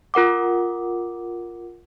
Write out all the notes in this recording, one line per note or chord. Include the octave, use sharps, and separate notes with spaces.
F4 A#4 F#5 D6